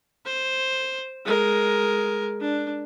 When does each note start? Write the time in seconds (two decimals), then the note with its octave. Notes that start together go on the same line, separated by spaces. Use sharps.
0.26 C5
1.25 G#3 A#4
2.40 D4